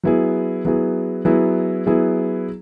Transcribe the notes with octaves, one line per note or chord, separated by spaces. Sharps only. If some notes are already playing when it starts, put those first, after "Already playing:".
F#3 B3 E4 G#4
F#3 B3 E4 G#4
F#3 B3 E4 G#4
F#3 B3 E4 G#4